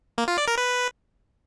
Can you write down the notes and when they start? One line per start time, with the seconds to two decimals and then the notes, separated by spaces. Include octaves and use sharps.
0.18 A#3
0.28 F4
0.38 D5
0.48 A#4
0.58 B4